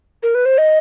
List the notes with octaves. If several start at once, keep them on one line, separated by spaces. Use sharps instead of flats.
A#4
B4
C5
D#5